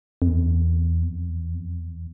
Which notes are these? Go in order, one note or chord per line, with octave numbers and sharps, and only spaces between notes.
F2
E2
F2
E2
F2
E2